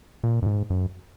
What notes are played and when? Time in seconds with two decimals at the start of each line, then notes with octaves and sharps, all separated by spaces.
0.24 A#2
0.42 F#2
0.47 G#2
0.70 F#2